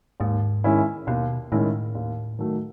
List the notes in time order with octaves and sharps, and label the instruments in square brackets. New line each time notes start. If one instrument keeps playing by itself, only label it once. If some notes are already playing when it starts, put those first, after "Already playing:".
[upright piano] D#2 [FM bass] G#2
[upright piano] D#3 G#3 C#4 E4
[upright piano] D#2 [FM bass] B2
[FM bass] A2 [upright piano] D#3 G#3 C#4 E4
[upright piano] D#2
D#3 F#3 A3